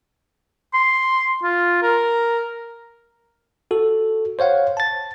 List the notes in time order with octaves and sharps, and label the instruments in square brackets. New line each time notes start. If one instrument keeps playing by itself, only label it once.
[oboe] C6
F4
A#4
[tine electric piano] F#4 A4
C5 C#5 F5 F#5
A5 A6